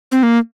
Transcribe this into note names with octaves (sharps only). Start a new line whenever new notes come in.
C4
A#3